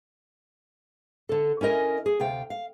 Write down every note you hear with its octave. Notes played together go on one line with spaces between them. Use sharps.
D3 A4
C#4 E4 A#4 D#5 G#5
G#4
D2 C3 F5 G5
F5